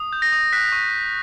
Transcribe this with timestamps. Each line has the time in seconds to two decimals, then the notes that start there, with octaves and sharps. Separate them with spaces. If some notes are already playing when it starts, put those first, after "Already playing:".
Already playing: D#6
0.13 G6
0.22 A#6
0.32 D#6
0.53 F#6 B6
0.72 C#6